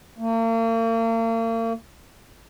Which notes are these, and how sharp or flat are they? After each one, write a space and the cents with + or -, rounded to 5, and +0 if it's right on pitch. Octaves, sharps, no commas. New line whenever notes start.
A#3 -40